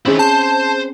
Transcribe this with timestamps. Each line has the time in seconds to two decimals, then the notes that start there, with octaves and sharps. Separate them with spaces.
0.06 D#3 C4 C#4 E4 G#4
0.19 C5 A5 C6